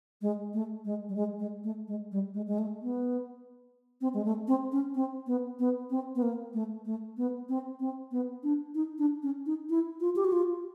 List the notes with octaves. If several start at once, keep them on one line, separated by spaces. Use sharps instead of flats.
G#3
A3
G#3
G3
G#3
G#3
A3
G#3
G3
G#3
G#3
A3
B3
C4
G#3
A3
C4
C#4
C4
B3
B3
C4
B3
A#3
A3
A3
B3
C4
C4
B3
D4
D#4
D4
C#4
D#4
E4
F4
G4
F#4
F4